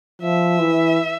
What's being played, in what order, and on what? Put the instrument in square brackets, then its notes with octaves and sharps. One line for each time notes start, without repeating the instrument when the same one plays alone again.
[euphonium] F3 [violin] E5
[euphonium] E3